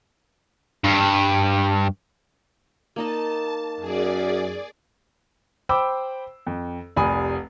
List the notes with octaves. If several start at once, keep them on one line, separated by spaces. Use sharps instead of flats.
G2
A#3 D#4 D#5 A5
F#2 G#4 D5
C5 G5 B5 D6 E6
F2
F1 C2 G#5 B5 D#6